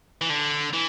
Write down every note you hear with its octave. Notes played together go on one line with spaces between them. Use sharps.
E3
D3
E3